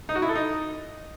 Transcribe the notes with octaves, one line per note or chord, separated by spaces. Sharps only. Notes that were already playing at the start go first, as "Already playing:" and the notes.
D#4
F#4
E4
A4
D#4